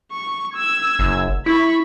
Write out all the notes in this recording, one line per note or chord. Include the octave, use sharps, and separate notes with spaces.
C#6
E6 G#6
F#1
E4 B5 C#6